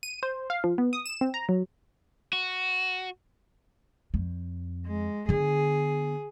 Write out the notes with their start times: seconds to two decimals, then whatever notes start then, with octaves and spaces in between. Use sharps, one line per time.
0.03 D#7
0.23 C5
0.50 F5
0.64 F3
0.78 B3
0.93 D#6
1.06 E7
1.21 C4
1.34 A#5
1.49 F#3
2.33 F#4
4.14 F2
4.87 G#3
5.29 D3 B3 G#4